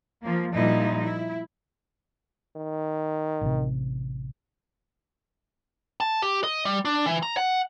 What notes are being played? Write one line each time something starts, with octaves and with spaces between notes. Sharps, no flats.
F3 A#3
A#2 F3 G3 D#4 E4
E4
D#3
A1 C3
A5
G4
D#5
G3
D4
E3
A#5
F#5